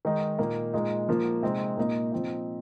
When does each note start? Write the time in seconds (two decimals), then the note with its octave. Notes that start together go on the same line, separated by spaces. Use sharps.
0.05 D#3 G#3 D#4
0.39 A#2 A#3 D#4
0.74 A#2 G#3 D#4
1.09 F3 A#3 D#4
1.42 C3 G#3 C4 D#4
1.77 A#2 A#3 D#4
2.12 F3 C4 D#4